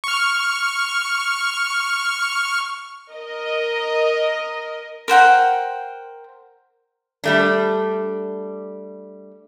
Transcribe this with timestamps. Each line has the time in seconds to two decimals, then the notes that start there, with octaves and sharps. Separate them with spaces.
0.04 C#6 F6
3.11 A#4 D#5
5.08 A#4 C5 F#5 G5
7.24 G3 A3 D4